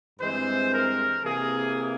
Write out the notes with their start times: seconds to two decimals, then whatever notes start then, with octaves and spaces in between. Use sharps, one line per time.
0.20 G2 E3 G#3 C4 C5
0.72 A#4
1.24 C3 E3 A#3 G#4